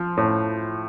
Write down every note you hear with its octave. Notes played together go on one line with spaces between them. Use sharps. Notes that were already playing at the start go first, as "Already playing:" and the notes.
Already playing: F3
A2